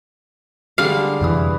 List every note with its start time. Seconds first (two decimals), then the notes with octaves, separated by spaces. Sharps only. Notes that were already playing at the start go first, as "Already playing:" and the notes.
0.78 D3 G3 G#3 F5
1.21 F2 C3 E3 D#6